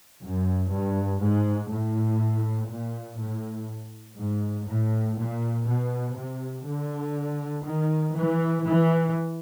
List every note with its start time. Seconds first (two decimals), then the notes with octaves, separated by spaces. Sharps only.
0.23 F#2
0.72 G2
1.21 G#2
1.71 A2
2.70 A#2
3.20 A2
4.18 G#2
4.68 A2
5.17 A#2
5.67 B2
6.16 C3
6.66 D3
7.65 D#3
8.15 E3
8.65 E3